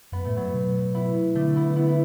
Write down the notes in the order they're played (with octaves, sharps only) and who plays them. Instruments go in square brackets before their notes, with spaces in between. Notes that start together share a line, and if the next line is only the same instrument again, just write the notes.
[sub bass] F#2 [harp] B3
[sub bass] A2 [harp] A3
[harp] F#3 B3
[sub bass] B2
[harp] B3 E4
[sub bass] D3 [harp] A3 D4
[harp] B3 E4
B3 E4
E4